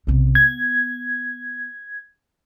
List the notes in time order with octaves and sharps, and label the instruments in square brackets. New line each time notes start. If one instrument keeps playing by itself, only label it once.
[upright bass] B1 C3
[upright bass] B3 [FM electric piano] G#6